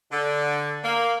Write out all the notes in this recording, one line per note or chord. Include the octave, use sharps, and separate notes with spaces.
D3
A#3